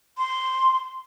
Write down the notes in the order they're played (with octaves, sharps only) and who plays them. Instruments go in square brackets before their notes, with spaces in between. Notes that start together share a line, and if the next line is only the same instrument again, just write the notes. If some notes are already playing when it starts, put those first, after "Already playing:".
[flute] C6